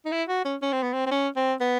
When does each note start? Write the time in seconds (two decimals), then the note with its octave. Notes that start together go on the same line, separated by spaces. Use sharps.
0.05 D#4
0.12 E4
0.29 F#4
0.45 C#4
0.62 C#4
0.72 C4
0.83 B3
0.93 C4
1.06 C4
1.11 C#4
1.36 C4
1.60 B3